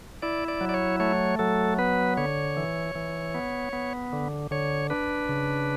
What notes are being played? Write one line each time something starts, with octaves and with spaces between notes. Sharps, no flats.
E4 D5
D5
F#3
D5
C#5
A3 C#5
F#3 A4
B3 B4
D3 C#5
E3
E3
B3
B3
D3
D3 C#5
D4 B4
C#3